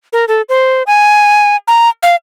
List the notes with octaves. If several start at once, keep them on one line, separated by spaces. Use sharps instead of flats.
A#4
A4
C5
G#5
A#5
F5